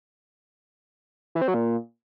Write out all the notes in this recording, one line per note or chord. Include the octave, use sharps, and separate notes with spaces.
E3
C4
F#3
A#2